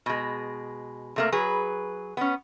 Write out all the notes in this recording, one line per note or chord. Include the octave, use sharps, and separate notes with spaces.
B2 G#3
C3 A3 A#3
F#3 G#4 B4
B3 C#4